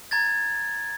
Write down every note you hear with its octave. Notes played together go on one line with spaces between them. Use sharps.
A#5 G#6 A6